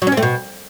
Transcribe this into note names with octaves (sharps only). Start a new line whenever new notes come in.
F#3
C#4
C4
A3
B2